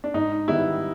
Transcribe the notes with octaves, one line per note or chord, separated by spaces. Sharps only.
D4
G#2 D#4
D#3 G3 B3 E4